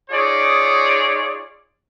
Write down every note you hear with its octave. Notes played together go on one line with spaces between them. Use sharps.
D#4 F4 G#4 C#5 D5